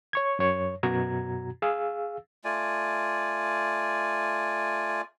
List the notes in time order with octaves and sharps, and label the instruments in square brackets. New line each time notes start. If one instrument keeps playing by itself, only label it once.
[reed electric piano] C#5 C#6 G#6
F#2 C#5
F#2 B2 F#4 A#5 G#6
G#4 F5 E6
[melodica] A3 F4 D5 G#5